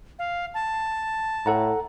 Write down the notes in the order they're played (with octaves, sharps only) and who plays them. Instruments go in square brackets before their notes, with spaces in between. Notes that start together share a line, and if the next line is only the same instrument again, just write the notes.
[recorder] F5
A5
[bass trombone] A2 [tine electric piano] A4 F#5 A#5